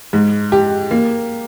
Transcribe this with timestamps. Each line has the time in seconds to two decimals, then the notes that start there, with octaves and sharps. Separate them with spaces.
0.13 G#2
0.52 G4
0.91 A#3